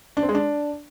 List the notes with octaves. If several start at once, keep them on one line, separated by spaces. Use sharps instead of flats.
D4
C4
G#3
D4